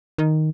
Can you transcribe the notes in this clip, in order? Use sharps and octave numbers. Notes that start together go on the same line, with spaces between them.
D#3